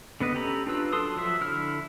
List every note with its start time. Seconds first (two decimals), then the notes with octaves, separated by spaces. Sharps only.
0.20 D3 B3 B4 D#5
0.34 C#4 G4 A4 A#5 B5
0.67 D4 F4 B4 E6
0.93 F#3 A4 C6 D#6
1.16 F3 F#3 E5
1.41 D3 E4 F6